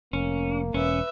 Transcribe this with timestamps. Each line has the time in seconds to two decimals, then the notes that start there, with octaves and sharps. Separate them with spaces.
0.13 F1 A#3 C#4
0.74 E1 C#4 B4 E5